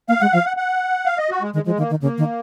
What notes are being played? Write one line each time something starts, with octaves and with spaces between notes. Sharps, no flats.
A#3 F5
G#3 F#5
F3 F5
F#5
F#5
F5
D#5
F#4
G#3
D#3 G#3
F3 G#3
D#3 A#3
D#3
C#3 A#3
D#3